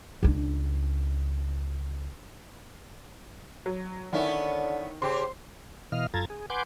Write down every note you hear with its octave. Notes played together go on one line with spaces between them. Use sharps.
C#2 D4
F#3
D3 D#3 B3 C#4 E4
C#3 G4 C5 C6
B2 E3 D#5 F5 F6
F#2 F4 A4 A#5 G#6 A6
G#4
B4 F#5 G#5 C6 D6 G6